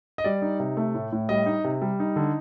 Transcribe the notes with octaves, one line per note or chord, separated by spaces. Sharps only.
D#5
G3 D5
D#4
C3
A3
A2
A2
G3 D#5
D#4
C3
G3
D#4
D3